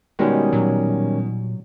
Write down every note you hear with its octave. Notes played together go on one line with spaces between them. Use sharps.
B2 D#3 G3 G#3 C#4
A#2 F#3